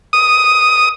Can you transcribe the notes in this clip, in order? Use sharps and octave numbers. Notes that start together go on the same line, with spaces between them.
D#6